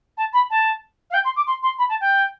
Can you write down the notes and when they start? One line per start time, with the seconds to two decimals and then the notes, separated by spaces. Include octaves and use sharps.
0.17 A5
0.33 B5
0.50 A5
1.11 F5
1.14 G5
1.25 C6
1.36 D6
1.47 C6
1.63 C6
1.78 B5
1.89 A5
2.01 G5